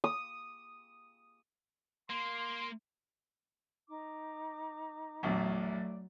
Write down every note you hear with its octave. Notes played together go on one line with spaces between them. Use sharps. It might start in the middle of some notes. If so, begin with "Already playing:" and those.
D#6
A#3 C6
D#4 D6
A#1 E2 F#3 A3 D5